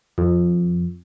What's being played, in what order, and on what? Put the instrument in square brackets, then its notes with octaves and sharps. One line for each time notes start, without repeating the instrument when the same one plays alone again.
[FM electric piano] F2